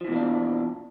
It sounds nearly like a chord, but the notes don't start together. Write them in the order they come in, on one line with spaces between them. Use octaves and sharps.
F3 E3 B2 A#3 D4